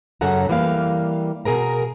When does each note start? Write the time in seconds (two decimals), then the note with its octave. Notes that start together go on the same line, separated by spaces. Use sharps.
0.21 F#2 C#3 C#4 A4 F#5 A#5
0.49 E3 G3 A#3 F5
1.45 B2 G#4 A#4 A#5